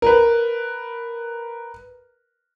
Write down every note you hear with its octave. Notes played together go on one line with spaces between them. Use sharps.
A#4 B4